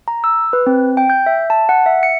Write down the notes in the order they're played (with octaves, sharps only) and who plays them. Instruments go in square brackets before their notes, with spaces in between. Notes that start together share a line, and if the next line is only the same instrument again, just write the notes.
[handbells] A#5
E6
B4
C4
G5
G6
E5
A5
F#5
E5
C#7